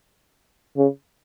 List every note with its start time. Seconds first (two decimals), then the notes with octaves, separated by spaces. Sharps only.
0.77 C#3